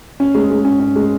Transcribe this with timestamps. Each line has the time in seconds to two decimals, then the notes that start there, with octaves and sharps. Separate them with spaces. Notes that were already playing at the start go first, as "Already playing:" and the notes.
0.20 C#4
0.35 G#3
0.51 G#3
0.65 C#4
0.80 C#4
0.96 G#3